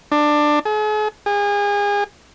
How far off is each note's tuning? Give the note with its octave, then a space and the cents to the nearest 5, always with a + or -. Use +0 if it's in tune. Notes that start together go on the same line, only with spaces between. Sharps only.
D4 +15
G#4 +45
G#4 -30